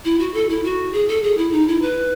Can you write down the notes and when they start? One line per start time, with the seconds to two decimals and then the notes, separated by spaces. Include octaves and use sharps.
0.05 E4
0.19 F#4
0.34 A4
0.49 E4
0.64 F#4
0.93 G#4
1.08 A4
1.23 G#4
1.37 E4
1.52 D#4
1.68 E4
1.82 B4